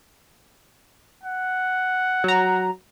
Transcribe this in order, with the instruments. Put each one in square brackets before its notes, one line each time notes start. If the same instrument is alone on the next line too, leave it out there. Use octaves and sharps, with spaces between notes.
[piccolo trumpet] F#5
[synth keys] F#3 A#5